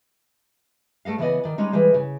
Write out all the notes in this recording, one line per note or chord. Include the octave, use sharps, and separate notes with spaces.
A3 A4 D#5 F5
C#3 E3 B3 E4 D5 D#5
D#3 D5
G3 G#3 C#4 D#4
E3 G3 G#3 C5
C#3